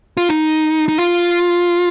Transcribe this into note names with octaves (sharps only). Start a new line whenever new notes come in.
F4
D#4
D#4
F4